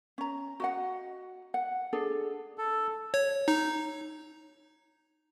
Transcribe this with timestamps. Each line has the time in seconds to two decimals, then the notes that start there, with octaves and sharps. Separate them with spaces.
0.18 C#4 A#5
0.60 F#4 D#5 F#5
1.54 F#5
1.93 D4 G#4 A4
2.58 A4
3.14 C#5
3.48 D#4